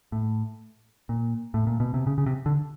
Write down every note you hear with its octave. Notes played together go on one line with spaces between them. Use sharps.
A2
A#2
A2
A#2
B2
C3
C#3
C#3
C3
D3